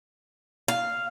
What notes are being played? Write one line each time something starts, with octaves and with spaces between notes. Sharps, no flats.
F5